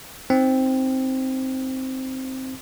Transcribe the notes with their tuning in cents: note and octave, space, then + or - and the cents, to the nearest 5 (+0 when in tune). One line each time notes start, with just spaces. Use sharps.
C4 +0 D#4 +0